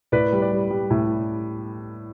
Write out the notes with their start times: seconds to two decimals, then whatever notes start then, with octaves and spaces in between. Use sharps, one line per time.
0.12 A2 B4 D5
0.32 G3
0.42 B4 D5
0.52 G3
0.71 G3
0.90 A2